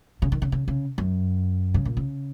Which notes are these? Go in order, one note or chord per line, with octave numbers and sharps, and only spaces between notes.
C#3
D#3
C#3
C#3
C#3
F#2
C#3
A#2
C#3